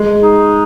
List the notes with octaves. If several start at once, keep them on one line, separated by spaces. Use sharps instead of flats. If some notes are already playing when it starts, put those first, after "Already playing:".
Already playing: G#3
D#4